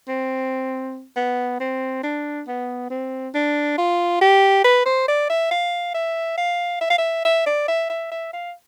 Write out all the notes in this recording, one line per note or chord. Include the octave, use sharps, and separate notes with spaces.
C4
B3
C4
D4
B3
C4
D4
F4
G4
B4
C5
D5
E5
F5
E5
F5
E5
F5
E5
E5
D5
E5
E5
E5
F5